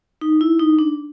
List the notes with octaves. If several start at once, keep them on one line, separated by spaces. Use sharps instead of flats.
D#4
E4
D#4
D4